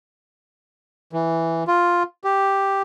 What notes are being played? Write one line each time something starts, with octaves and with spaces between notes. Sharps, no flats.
E3
F4
G4